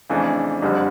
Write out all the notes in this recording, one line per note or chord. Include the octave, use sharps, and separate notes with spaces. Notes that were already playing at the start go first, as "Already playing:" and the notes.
F2 C#3 E3 A3 D4
F#1 F2 D3 G3